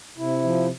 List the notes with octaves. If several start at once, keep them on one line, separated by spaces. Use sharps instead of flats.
C3 E4
F3